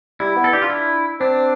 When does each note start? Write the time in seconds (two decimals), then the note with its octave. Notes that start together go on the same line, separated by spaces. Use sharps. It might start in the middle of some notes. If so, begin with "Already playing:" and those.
0.20 G3 E4
0.36 B3
0.44 A4
0.53 D4 G4
0.62 F4
0.69 E4
1.20 C4 D4